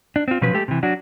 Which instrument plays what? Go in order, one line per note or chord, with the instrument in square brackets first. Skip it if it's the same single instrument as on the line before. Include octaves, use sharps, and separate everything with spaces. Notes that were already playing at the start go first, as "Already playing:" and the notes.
[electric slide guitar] D4
C4 F4
B2 F3 F#3 C#4 B4
G#3 A3 G4 A4
C3 E3
F#3 D4 F#4